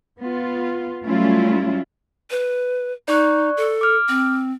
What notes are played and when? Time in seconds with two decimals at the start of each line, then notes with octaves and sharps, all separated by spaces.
0.19 B3 F4
1.06 F#3 G3 A3 C#4 E4 F4
2.31 B4
3.08 D#4 D5 C#6 F#6
3.57 A4
3.81 D6 F6
4.09 C4